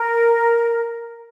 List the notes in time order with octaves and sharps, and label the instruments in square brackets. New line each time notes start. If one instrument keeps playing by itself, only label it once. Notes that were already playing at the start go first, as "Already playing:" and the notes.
Already playing: [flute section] A#4